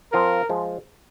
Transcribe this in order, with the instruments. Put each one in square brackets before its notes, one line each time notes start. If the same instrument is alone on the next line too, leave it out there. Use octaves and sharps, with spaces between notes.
[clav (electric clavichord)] F3 C4 F4 C5 [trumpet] A#4
[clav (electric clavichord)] F3 G#3